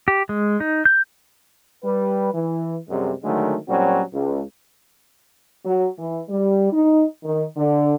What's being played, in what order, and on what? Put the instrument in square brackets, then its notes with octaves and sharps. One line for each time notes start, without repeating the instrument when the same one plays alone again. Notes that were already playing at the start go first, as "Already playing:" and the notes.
[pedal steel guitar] G4
G#3
D#4
G6
[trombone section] G3 B4
E3
F#2 C3 G3 G#3
D3 D#3 F#3 G#3 A3
A#2 F#3 G3 C4 C#4 F#4
C#2
[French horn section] F#3
E3
G3
D#4
D#3
D3